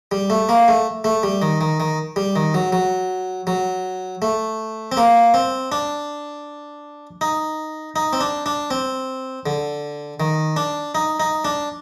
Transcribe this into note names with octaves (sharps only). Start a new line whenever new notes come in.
G3
A3
A#3
A3
A3
G3
D#3
D#3
D#3
G3
D#3
F#3
F#3
F#3
A3
C4
A#3
C4
D4
D#4
D#4
C4
D4
D4
C4
D3
D#3
D4
D#4
D#4
D4